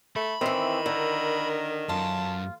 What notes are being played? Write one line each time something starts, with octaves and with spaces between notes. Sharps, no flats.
A3 B5
D#3 E3 C4 E5
D3 A#4
F#2 F4 A5